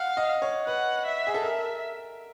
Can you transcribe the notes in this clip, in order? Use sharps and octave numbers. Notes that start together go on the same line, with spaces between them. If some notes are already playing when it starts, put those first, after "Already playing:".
Already playing: F5 F#5
D#5
C#5
B4 F#5
E5
G#4
A4
A#4 E5